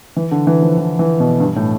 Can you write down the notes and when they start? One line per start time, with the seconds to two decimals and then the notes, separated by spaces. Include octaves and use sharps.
0.16 E3
0.31 D3
0.47 E3
0.62 F3
0.78 E3
0.99 E3
1.20 B2
1.40 G2
1.56 A2